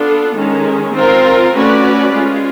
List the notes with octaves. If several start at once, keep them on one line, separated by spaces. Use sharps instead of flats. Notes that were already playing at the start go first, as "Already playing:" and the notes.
Already playing: B3 D4 F4 A4
D#3 G#3 C#4
C4 F4 A#4
A3 C#4 F#4 B4 D5
G#3 C#4 F4